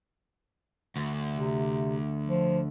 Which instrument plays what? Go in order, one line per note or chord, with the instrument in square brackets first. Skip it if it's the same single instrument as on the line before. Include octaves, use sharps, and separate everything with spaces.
[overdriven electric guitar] D2
[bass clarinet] C3
F3